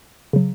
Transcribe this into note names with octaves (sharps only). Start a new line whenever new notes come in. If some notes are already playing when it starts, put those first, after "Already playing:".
C#3 F#3